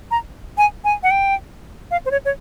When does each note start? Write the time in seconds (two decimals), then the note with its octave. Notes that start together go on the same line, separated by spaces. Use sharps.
0.11 A#5
0.58 G#5
0.84 G#5
1.03 F#5
1.11 G5
1.91 F5
2.06 C5
2.11 C#5
2.25 C#5